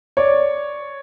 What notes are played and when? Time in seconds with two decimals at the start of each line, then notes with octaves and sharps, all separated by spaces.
0.17 C#5 D5